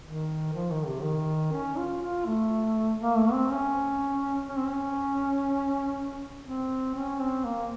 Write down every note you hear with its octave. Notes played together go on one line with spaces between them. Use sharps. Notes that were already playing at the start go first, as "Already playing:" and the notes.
D#3
F3
D#3
C3
D#3
C#4
F4
F4
A3
A#3
A3
C4
C#4
C#4
C4
C#4
C4
C#4
C4
A#3